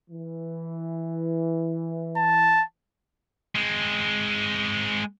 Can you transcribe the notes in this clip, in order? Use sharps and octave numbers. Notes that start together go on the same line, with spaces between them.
E3
A5
G#3 C4